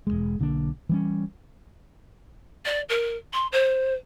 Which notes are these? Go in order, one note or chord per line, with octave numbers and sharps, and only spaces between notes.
E1 C#2 G#3
B1 D3 A#3 D4
E3 G3 C#4
D5
A#4
C6
C5